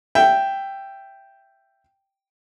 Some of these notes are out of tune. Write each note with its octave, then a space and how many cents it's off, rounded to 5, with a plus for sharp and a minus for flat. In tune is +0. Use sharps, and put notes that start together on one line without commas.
E5 +15 G5 +0